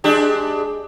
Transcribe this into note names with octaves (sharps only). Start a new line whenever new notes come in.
G#3 D4 G4